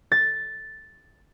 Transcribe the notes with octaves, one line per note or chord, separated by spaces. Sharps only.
A6